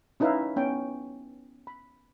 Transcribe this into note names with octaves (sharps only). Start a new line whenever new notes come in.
C#4 D#4 E4 B4 E5 F5
B3 C#4 G5
B5